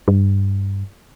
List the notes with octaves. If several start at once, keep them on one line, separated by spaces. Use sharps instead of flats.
G2